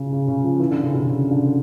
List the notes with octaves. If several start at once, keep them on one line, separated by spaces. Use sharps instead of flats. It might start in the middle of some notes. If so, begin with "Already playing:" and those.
Already playing: C#3
C#3
C#3
F3
E3
D3
C#3
C3
C#3
D3